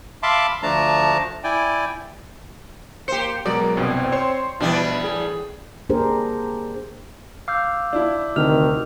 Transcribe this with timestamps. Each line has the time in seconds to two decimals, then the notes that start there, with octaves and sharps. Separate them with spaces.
0.23 E5 F5 A5 B5 C6 D6
0.62 D2 F3 A3 D4 A5 A#5
1.44 E4 D5 G5 G#5
3.08 A#3 G4 C5 C#7
3.45 B2 F#3 G#3 A#4 D5
3.77 C2 G2 B2 C4
4.12 C5 C#5 C6
4.60 B2 E3 G3 D4 E4
5.04 A2 G#4
5.89 A#3 D4 G4 G#4 A#4 C5
7.48 F5 D6 E6 G6
7.93 D4 E4
8.36 D2 C3 D#3 F6 F7